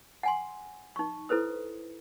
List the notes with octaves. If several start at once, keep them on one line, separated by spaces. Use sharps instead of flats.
F#5 G#5 C6
D#4 C#6
E4 A4 B4 C5 D#6